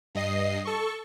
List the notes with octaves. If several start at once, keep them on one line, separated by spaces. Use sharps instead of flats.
G2 D#5 C7
A4 C#6